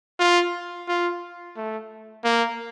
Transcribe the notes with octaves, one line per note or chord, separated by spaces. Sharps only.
F4
F4
A3
A#3